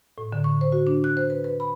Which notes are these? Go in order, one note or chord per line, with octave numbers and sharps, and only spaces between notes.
A2
D3
C#6
C5
F#4
D4
F#6
C5
B4
B4
B5